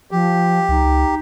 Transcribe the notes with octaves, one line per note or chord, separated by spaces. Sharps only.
F3 G4
C#2 D#4